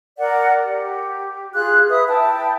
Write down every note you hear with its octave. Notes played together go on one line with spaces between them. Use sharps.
A#4 D5 F#5
G4
F4 G#4 F#6
B4 E5 D#6
E4 G5 A5